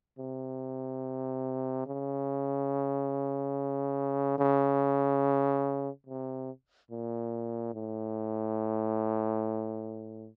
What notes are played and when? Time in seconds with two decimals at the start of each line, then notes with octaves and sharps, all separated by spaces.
0.19 C3
1.87 C#3
4.38 C#3
6.06 C3
6.91 A#2
7.74 A2